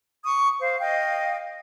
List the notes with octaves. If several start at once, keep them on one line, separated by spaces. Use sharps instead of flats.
C#6 D#6
C5 F5
D#5 F5 G5